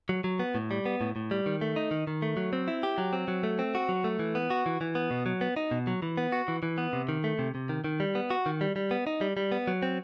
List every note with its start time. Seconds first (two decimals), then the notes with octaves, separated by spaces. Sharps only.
0.09 F#3
0.24 F#3
0.39 B3
0.55 A2
0.71 G3
0.86 B3
1.01 A2
1.16 A2
1.31 G3
1.46 D#3
1.61 A3
1.76 D#4
1.91 D#3
2.07 D#3
2.22 A3
2.37 F#3
2.53 C4
2.68 E4
2.83 G4
2.98 F#3
3.13 C4
3.28 F#3
3.43 A3
3.59 C4
3.75 F#4
3.89 F#3
4.04 A3
4.19 E3
4.35 B3
4.50 F#4
4.66 E3
4.81 E3
4.95 B3
5.11 B2
5.26 F#3
5.41 B3
5.56 D#4
5.71 B2
5.87 F#3
6.02 E3
6.17 B3
6.32 F#4
6.48 E3
6.63 E3
6.78 B3
6.93 C3
7.09 D#3
7.24 A3
7.39 C3
7.55 C3
7.69 D#3
7.84 D#3
8.00 G3
8.15 B3
8.30 F#4
8.46 D#3
8.61 G3
8.76 G3
8.91 B3
9.07 D#4
9.21 G3
9.37 G3
9.52 B3
9.67 F#3
9.82 C4